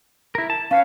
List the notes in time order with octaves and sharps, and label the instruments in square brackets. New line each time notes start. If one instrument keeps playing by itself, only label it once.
[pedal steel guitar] E4 A#4
A5
[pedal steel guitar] C#4 B4 C#5 [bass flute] F5